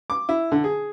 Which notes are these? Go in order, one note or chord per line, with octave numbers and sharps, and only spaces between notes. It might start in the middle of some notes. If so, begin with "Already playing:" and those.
D6
E4
D3
G#4